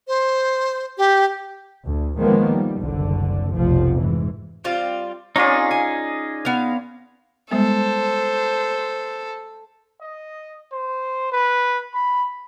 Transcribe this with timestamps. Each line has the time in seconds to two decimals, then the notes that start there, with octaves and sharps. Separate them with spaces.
0.08 C5
0.98 G4
1.84 D2
2.18 D#3 F3 G#3 A#3 B3
2.49 G3
2.79 F#1 C2 D3
3.53 F1 B1 F3
3.97 G#2 E3
4.64 G3 C4 F4
5.36 C4 C#4 D#4 F4 G#4 C#5 D5
5.71 G#5
6.45 B3 F5
7.51 G3 G#3 B3 A4 C5
10.01 D#5
10.72 C5
11.32 B4
11.94 B5